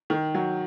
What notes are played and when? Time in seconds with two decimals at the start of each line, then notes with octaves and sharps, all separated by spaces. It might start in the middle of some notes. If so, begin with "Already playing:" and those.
0.10 D#3
0.34 F#3